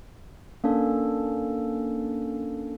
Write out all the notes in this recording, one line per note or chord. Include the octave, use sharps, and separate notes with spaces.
A#3 C#4 D4 A4